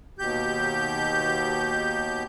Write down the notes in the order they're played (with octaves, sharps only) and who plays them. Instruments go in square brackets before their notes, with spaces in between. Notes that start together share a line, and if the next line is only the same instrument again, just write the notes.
[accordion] D#2 B2 G4 G6